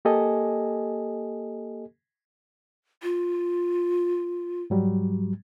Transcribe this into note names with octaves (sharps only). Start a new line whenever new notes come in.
A#3 G4 A4 D#5 G#5
F4
G#2 F#3 G3